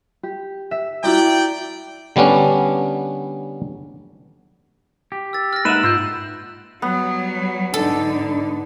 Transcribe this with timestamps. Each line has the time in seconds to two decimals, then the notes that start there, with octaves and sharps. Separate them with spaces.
0.23 G4
0.71 E5
1.04 E4 F#4 D5 G5 A#5
2.16 D3 G3 B3 C#4 D4
5.12 G4
5.33 E6 A6
5.53 F6 A#6
5.65 G#3 A#3 D#4 B4 E5 F#5 D7 E7
5.83 G#2 F4 D#5 E6 F#6 G6
6.82 F#3 G3 B3
7.74 G#2 D3 D4 D#4 A4